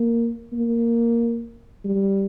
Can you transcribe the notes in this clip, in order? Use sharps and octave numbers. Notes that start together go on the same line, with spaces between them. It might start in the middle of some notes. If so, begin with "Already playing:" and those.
Already playing: A#3
A#3
G3